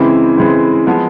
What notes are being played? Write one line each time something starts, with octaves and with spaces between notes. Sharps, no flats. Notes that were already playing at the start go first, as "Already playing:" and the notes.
Already playing: C#3 E3 G#3 C4 E4
C#3 E3 G#3 C4 E4
F3 G#3 B3